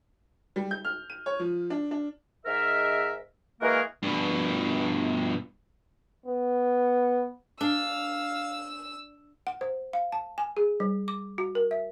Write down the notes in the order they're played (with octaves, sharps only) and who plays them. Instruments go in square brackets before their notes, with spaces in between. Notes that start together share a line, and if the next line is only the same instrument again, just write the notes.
[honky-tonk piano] G3
G6
F6
D#7
C#5
F3
D4
D4
[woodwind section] G#2 A#4 E5
E3 G#3 A#3 F#4 G#4 A#4
[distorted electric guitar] G2 B2
[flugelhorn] B3
[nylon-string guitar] D4 [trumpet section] F5 [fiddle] E6
[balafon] F#5
C5
F5
A5
G#5
G#4
G3
D6
F#4
A#4
E5